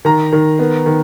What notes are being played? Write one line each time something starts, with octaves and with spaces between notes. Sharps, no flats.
D#3 A#5
D#3
B3
D#3